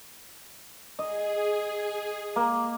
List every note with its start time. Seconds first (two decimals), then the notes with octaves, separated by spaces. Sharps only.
0.99 G#4 D#5
2.36 A#3